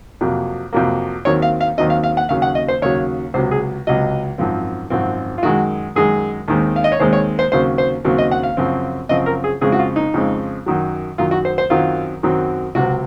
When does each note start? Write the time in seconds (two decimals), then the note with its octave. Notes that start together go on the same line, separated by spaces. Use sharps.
0.21 F2 C3 F#3 A#3
0.73 F2 C3 F#3 A#3
1.25 D#2 D#3 F#3 C4 C#5
1.42 F5
1.60 F5
1.78 D#2 D#3 F#3 C4 D#5
1.90 F5
2.03 F5
2.17 F#5
2.29 D#2 C#3 F#3 F5
2.42 F#5
2.55 D#5
2.68 C5
2.82 D#2 C#3 F#3 C#5
3.34 C#2 C3 F#3 C5
3.51 G#4
3.87 C#2 C3 F#3 D#5
4.38 G#1 F#2 F3 C4
4.90 G#1 F#2 F3 C4 F#4
5.38 F4
5.43 F#2 D#3 G#3 F#4
5.96 F#2 D#3 G#3 G#4
6.48 D#2 D#3 G#3 C4
6.76 F5
6.84 D#5
6.92 C#5
7.00 D#2 D#3 G#3 C4 C5
7.13 C#5
7.39 C5
7.52 D#2 C#3 F#3 C4 C5
7.78 C5
8.05 D#2 C#3 F#3 C4
8.18 D#5
8.31 F#5
8.43 F5
8.57 F#2 C#3 F3 C4
9.09 F#2 C#3 F3 C4 D#5
9.26 A#4
9.44 G#4
9.61 F2 C#3 G#3 C4 G#4
9.72 F#4
9.79 F4
9.96 D#4
10.14 F2 C#3 G#3 C4
10.66 F#2 D#3 F#3
11.18 F#2 D#3 F#3 F4
11.31 F#4
11.45 C5
11.58 C5
11.70 F#2 D#3 F#3 C4 F4
12.23 F#2 D#3 F#3 C4
12.75 C#2 C3 F#3 C4 F#4